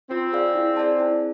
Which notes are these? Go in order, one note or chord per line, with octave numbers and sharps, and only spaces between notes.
C4 F4
G#4 D5 F5
E4
G#4 D5 A5
E4